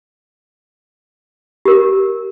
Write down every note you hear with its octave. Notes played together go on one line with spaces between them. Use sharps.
G4 A#4